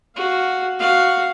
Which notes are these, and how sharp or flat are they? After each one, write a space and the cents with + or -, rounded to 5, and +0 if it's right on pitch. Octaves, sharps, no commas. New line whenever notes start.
F#4 +0 F5 +0
F#4 +0 F5 +0